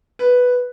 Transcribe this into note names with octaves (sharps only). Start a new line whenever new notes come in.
B4